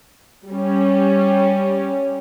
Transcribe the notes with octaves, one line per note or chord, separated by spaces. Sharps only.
G3 C#4